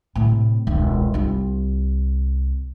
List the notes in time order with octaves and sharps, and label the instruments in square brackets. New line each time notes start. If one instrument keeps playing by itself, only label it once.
[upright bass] A2 C3
E1 C#2
C2 F4